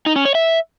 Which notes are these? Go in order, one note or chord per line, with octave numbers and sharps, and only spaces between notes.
D#4
C#4
C#5
E5